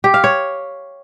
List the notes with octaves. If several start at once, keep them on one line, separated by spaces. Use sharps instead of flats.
G4
F5
C#5